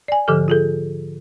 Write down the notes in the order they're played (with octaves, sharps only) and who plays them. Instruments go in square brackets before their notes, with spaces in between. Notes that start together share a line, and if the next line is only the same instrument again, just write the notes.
[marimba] D5 G#5
G#2 D3 F3 G4 A4 F6
F4 G#4 A4